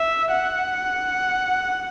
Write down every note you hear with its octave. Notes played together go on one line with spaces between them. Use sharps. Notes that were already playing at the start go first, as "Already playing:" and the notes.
Already playing: E5
F#5